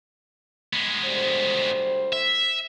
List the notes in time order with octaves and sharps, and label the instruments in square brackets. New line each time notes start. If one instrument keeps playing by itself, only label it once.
[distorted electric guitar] G#3 B3
[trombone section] D2 G3 C5
[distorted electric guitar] E5